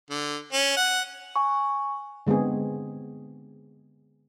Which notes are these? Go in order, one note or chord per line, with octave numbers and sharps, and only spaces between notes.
D3
C#4
F#5
G#5 C#6
D3 G#3 B3 C4 G#4